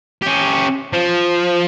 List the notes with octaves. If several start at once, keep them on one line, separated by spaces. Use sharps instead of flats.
C#4 G4
F3